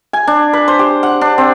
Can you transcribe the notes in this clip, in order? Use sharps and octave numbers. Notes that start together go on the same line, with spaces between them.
G#5
D4
B4
C5
G4
F#5
D4
C4